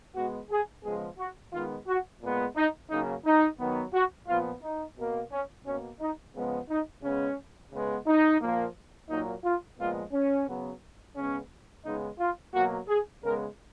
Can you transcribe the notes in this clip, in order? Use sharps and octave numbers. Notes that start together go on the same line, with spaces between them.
B2 G#3 B3 F#4
G#4
C#3 F3 G#3 B3 G#4
F#4
D#3 G#3 B3 F4
F#4
A#2 G#3 B3
D#4
C#3 F#3 A#3 D#4
D#4
D#3 F#3 B3
F#4
A#2 F3 B3 F4
D#4
B2 A#3
C#4
B2 A#3 C#4
D#4
C#3 F3 G#3 B3
D#4
C#3 G#3 B3 C#4
C#3 G#3 B3
D#4
A#2 F3 A#3
A#2 F#3 A#3 D#4
F4
A#2 F3 G#3 B3 F4
C#4
C#3 F#3 B3
C#3 G#3 B3 C#4
C#3 G#3 B3 D#4
F4
B2 F#3 A#3 F#4
G#4
C#3 G#3 B3 A#4